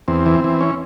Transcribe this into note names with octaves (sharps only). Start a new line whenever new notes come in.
E2 C4
E3
E3
C#4